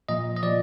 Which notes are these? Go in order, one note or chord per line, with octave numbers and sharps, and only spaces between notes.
A#2 F3 D#5
D#5
A#2 F3 D5